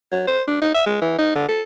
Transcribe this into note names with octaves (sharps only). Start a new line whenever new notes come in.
F#3
C5
D4
D#4
E5
G#3
E3
D#4
D3
A4